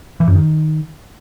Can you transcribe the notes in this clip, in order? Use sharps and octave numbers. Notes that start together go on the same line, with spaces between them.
E3
F#2
D#3